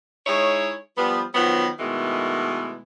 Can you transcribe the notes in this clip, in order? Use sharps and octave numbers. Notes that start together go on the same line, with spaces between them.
G#3 D#4 E4 C#5
F3 G3 B3
D#3 F3 F#3 B3
B2 D#3 E3 G#3 A3